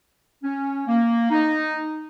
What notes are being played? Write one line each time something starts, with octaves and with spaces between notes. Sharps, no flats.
C#4
A#3
D#4